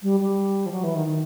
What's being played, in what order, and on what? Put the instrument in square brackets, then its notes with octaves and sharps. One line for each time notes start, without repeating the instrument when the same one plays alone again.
[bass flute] G3
G3
F3
F#3
E3
D#3
D#3